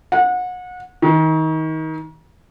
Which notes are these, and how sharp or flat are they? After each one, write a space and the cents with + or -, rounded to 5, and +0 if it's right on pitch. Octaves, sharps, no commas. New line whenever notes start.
F#5 -30
D#3 +30